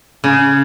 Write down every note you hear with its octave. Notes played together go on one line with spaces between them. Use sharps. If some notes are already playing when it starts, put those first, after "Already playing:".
C#3